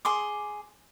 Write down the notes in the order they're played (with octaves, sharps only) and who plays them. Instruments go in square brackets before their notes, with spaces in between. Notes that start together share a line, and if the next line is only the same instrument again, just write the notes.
[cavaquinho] G#4 C6 D6